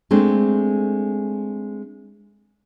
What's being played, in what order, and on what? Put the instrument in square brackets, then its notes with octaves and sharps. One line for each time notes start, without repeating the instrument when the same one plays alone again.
[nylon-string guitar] G#3 A3 C4 D4